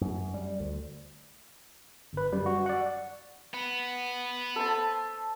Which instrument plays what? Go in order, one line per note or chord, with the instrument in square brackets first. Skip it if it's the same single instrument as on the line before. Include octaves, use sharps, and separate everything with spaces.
[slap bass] F#2
G3
D2
[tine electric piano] G1 B4
F#2 G3
F#4
D5 F#5
[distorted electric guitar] B3
[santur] A4 C5 A5